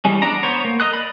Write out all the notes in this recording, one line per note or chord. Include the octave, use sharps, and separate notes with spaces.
E3 G3 G#3 C#4
B3 D4 D5 A#5
B3 C5 C#5
A#3
A#4 D#5 D#6 F#6
D5 B5